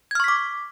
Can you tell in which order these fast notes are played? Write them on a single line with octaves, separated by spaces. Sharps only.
G#6 F6 C#6 B6 D6